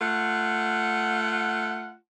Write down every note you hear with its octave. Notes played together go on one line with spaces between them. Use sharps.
A3 F4 F#5